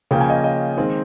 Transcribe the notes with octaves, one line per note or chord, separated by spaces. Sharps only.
C#3 F3 A#3 C#4 G5
G#5
D#5 G5
D#5 G5
D#3 G#3 C4